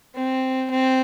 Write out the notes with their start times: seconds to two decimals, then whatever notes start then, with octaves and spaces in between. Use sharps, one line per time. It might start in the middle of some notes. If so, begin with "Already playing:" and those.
0.15 C4
0.70 C4